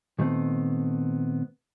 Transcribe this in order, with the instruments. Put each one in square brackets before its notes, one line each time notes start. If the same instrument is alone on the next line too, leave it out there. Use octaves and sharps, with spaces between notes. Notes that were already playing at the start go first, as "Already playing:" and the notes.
[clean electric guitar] A#2 D#3 G3 A3 B3 C4